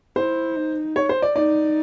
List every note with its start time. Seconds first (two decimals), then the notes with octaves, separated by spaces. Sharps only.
0.16 E4 C5
0.56 D#4
0.96 C#5
1.09 C5
1.22 D5
1.35 D#4 D5